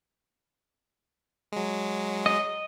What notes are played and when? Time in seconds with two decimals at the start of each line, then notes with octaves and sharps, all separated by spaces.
1.52 F#3 G#3
2.26 D#5